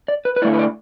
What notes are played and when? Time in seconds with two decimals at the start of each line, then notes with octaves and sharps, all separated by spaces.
0.08 D5
0.25 B4
0.36 B4
0.42 D3 A3 E4 D5
0.53 B4
0.59 D5